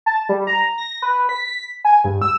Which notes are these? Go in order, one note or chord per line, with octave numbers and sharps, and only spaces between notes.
A5
G3
A#5
A#6
B4
B6
G#5
G2
E6